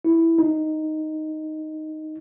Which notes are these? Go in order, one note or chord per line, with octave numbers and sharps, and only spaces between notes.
E4
D#4